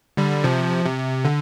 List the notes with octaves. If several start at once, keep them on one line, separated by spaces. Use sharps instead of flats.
D3 G3
C3 F3
C3
D3